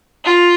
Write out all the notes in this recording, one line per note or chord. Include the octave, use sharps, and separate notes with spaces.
F4